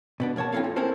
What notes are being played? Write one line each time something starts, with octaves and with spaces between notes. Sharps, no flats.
B2 B3 D4
F2 A#3 C#5 F#5 A5
C4 E4 F4 A4 F5
A#3 F4
C4 C#4 E4 A4 A#4 C5